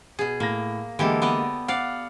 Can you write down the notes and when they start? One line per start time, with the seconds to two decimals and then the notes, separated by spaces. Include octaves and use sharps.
0.19 B2 G#4
0.40 A2 A#3 A#6
0.99 D3 E3 G#3 A#3 G4 A4
1.22 B3 D5 D#5
1.68 D5 F5 F#5